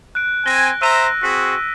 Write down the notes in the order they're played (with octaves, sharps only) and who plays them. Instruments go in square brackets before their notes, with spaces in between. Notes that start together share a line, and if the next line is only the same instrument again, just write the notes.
[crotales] F#6 D7
[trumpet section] C4 G#5 [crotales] A#6 G7
[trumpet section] C5 E5 A#5 [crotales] E6 D#7
[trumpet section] C4 F#4 G#4 [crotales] B6